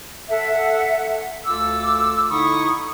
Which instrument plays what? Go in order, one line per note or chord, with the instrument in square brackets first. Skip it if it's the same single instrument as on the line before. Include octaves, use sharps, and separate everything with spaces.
[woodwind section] A4 E5 F#5
D2 F4 A4 D6 E6
D3 D#4 E4 B5 C#6 D#6